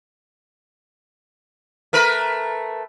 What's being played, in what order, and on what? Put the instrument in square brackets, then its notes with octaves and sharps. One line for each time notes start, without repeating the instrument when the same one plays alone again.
[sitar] A3 A#4 B4